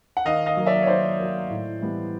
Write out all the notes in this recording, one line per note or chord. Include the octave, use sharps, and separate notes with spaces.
F#5
D#3 D#5 F5
D#5 F5
F#3 A#3
D5 E5
C#5
D#3 C5 D5
F#3 A#3
A2
E3 G3 B3